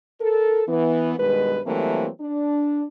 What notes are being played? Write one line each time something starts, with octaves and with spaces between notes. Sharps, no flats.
A4 A#4
E3 B3
G2 B2 D#3 G#3 B4
E3 F#3 G3 A3 A#3 C4
D4